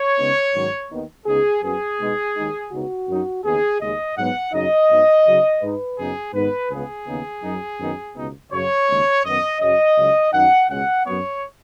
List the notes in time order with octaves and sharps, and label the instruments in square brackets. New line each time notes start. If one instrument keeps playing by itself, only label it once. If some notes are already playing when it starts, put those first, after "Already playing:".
Already playing: [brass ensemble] C#5
C#3 G#3 B3 D#4
G#2 D#3 F#3 C#4
D#2 D#3 B3 D#4
C#2 C#3 B3 D#4 G#4
F#2 F#3 B3 G#4
B2 G#3 B3 D#4
D#2 D#3 G#3 D#4
C#2 C#3 B3 D#4 F#4
F#2 F#3 D#4
D#2 C#3 B3 D#4 G#4
D#2 C#3 G#3 D#5
G#2 F#3 B3 F#5
F#2 C#3 F#3 D#4 D#5
G#2 F#3 B3 D#4
C#3 F#3 D#4
G#2 G#3 D#4 B4
F#2 C#3 B3 D#4 G#4
G#2 D#3 B3 D#4 B4
C#2 C#3 B3 G#4
D#2 C#3 B3 D#4
F#2 F#3 D#4
F#2 D#3 B3 D#4
C#2 B2 B3 D#4
F#2 C#3 F#3 C#5
D#2 C#3 G#3 C#4
F#2 D#3 B3 D#5
F#2 C#3 F#3 C#4 D#5
C#2 C#3 F#3
F#2 D#3 F#3 D#4 F#5
C#2 B2 G#3 C#4 F#5
F#2 F#3 B3 C#5